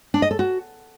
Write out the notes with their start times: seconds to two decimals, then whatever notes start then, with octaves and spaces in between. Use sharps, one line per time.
0.14 D4
0.22 D#5
0.31 A4
0.39 F#4